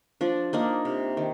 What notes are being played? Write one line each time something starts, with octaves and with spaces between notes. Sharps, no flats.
F3 D4
A#3 D4 D#4
C3
D#3